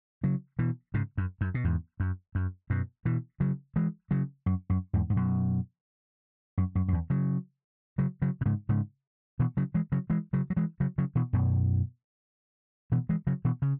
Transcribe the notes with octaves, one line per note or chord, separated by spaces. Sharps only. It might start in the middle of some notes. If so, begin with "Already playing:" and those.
C#3 F#3
B2 E3
G#2 C#3
F#2
F#2
B2
E2 G#2
F#2
F#2
F#2 B2
B2 E3
C#3 F#3
E3 G#3
C#3 F#3
F#2
F#2
E2 G#2
G#2
F#2 B2
F#2
F#2
F#2
E2
C#3 F#3
C#3 F#3
C#3 F#3
B2
G#2 C#3
G#2 C#3
B2 E3
C#3 F#3
E3 G#3
C#3 F#3
E3 G#3
C#3 F#3
F#3
E3 G#3
C#3 F#3
C#3 F#3
B2 E3
F#2 B2
B2 E3
E3 G#3
C#3 F#3
B2 E3
C#3